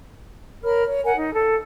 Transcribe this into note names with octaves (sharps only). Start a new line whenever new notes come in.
A#4 C#5 B5 F6
C#5
A#4 F#5 G#5
D#4
A4